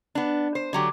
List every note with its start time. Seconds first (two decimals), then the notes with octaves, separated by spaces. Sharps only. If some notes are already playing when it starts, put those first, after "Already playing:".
0.15 B3 D4
0.55 C5
0.73 D3 F#3 G4